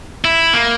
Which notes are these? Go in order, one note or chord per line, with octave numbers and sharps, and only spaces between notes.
E4
A#3